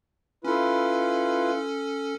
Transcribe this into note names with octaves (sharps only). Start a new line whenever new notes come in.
C#4 E4 F4 A4 B4